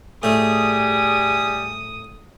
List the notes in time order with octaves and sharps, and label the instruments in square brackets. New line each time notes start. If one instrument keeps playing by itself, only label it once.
[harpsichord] A2 A3 [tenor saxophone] G3 [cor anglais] G#4 [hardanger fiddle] D#6